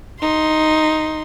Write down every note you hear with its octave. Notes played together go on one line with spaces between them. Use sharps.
D#4 C6